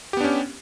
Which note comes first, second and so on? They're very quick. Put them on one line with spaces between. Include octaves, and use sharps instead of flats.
G4 B3 D4 C#4